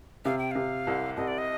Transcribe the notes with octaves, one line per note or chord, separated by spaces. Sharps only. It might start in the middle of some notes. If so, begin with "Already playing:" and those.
C3 F5
G5
C3 F5
C2
C2 D#5
D5
D#5